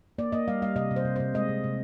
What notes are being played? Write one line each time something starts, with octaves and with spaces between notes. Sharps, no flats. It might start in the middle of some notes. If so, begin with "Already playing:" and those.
A#3 D5
A#3 D#5
G3 F5
G3 F5
C3 D#5
C3
C5
C3
C3 C5
G#3 D#5
C3
C3